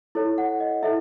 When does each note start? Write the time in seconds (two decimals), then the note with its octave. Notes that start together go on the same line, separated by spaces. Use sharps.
0.15 E4 A4 C#5
0.38 F#5
0.60 D#5
0.83 E4 A4 E5